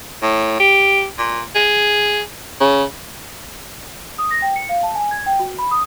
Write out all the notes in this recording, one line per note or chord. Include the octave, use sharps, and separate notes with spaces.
A2
G4
A#2
G#4
C#3
D#6
A#6
G5
C#7
F5
A5
G#5
G#6
G5
F#4
B5
D#6